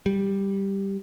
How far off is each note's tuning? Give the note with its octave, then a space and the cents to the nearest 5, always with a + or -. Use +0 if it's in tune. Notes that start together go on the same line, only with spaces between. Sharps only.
G3 +5